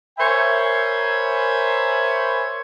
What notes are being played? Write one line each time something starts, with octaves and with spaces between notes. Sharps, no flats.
A#4 C5 C#5 E5 G#5 B5